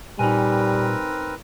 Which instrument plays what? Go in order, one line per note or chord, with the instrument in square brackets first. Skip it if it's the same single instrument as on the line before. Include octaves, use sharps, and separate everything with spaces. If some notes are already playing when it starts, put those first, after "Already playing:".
[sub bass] A#2 [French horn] G3 [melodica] C4 A#4 B4 [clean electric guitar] D#4 G#5